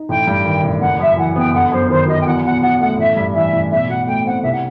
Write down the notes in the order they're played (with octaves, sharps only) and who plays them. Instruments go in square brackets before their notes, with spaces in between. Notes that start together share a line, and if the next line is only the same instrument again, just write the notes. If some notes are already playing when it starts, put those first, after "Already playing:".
Already playing: [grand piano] D#4
[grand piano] A1 [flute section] G5
[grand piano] G2
D#3
A1
[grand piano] F#1 [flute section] F#5
[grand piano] F#2 [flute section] E5
[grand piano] E3 [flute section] F#5
[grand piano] B3 [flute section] G5
[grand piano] G1 [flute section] F#5
[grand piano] F#2 [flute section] C5
[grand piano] D#3 [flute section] C5
[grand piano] F#3 [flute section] D#5
[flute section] G5
[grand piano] E2 [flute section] F#5
[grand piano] B2 [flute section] F#5
[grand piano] F#3 [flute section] F#5
[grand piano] A3 [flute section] F#5
[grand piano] A1 [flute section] E5
[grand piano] G2
[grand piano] E3 [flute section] E5
[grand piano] A1
[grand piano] B1 [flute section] E5
[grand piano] B2 [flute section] F#5
[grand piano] A3 [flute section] G5
[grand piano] C4 [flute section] F#5
[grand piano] C2 [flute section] E5
[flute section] F#5